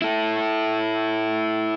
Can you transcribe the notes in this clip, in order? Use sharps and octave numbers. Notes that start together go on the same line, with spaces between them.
E4 A4